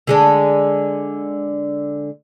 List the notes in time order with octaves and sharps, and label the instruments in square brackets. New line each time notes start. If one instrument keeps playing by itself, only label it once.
[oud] D3 G#3 D4